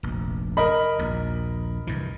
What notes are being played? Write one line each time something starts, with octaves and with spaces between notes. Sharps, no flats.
F1 A#1
A#4 D#5 B5
A#1 D#2
C2 G2 E3